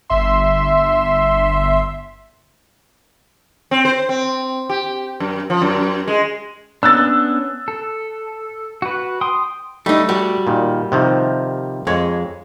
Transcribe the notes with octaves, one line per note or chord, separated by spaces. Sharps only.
G1 E5 C6
C4
C5
C4
G4
F#2
F3
F#2
G#3
B3 C#4 D4 E6 F#6 A6
A4
F#4 B4
G5 C6 D#6
G3 A3 D#4
G3 F#4
A#2 D#3
C3 D#3 F3
F2 G#3 C#5